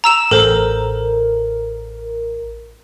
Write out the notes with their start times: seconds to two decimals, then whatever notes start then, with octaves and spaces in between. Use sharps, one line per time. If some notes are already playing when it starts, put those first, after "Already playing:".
0.04 A#5 E6 E7
0.31 A1 A4 A#4 C5